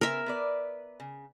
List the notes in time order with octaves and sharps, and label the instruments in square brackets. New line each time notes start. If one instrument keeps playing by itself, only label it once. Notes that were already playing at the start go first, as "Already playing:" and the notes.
[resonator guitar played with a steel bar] C#3 B3 C5 [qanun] A#4 E5
[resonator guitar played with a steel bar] B3 B4 D5
C#3